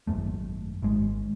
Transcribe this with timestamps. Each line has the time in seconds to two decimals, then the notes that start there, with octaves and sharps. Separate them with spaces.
0.07 G#1 C#2 F#2 A3
0.82 G#1 G#3